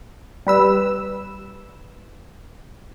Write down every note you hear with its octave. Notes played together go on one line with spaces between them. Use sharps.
G3 B4 E6